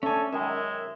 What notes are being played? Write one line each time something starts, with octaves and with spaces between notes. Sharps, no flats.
A3 C#4 D4 A4 G#5
F#2 D#3 G#3 E5